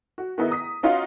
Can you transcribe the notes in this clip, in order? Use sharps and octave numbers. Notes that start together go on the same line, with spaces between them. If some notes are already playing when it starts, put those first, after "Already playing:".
F#4
D#3 B3 D#4 E4 G#4
A#5 D#6 B6
C#4 D#4 F4 F#4 F5 F#5